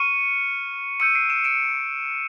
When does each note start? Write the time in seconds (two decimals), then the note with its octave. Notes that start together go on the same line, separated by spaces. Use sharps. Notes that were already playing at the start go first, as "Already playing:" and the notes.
Already playing: C#6 F6 C#7 D#7
1.00 C#6 E6 G6 C#7 D#7
1.15 C7 D7
1.30 D7 E7
1.44 D7 E7